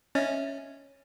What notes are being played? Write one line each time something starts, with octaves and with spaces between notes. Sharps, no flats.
C#4 D#5 E5